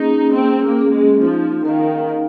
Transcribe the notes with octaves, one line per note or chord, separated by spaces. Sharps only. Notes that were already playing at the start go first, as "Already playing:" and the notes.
Already playing: A#3 C#4 D#4 G#4
A#3 C4
A#3
C#4 G#4
G#3
F3 D#4
D#3 A#4 F5
D#4